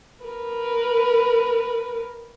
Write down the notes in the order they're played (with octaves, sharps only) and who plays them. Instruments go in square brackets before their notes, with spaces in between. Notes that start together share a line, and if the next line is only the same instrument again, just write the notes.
[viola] A#4 B4